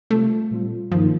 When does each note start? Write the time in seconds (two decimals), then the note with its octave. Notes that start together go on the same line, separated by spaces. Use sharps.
0.10 C3 G3 A3 C4 F4
0.50 A#2 G3 C4 F4
0.91 G2 D#3 F3 A#3 D#4